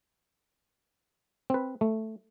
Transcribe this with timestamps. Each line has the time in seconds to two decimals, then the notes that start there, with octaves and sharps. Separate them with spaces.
1.50 C4 B4
1.81 A3